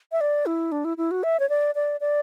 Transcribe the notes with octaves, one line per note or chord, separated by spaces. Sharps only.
E5
D5
E4
D4
E4
E4
F#4
E5
C#5
D5
D5
D5